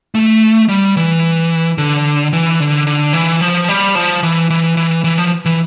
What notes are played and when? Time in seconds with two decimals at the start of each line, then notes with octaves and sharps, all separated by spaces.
0.15 A3
0.69 G3
0.97 E3
1.78 D3
2.33 E3
2.60 D3
2.87 D3
3.13 E3
3.41 F3
3.69 G3
3.95 F3
4.23 E3
4.50 E3
4.77 E3
5.04 E3
5.18 F3
5.46 E3